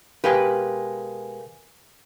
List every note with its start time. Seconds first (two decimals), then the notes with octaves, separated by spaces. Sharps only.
0.24 B2 G#3 G4 A#4 B4 F5 G#5